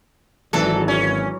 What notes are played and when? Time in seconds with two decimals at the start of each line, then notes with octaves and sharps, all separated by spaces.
0.53 G#1 E3 F#3 D4 A4
0.88 C#4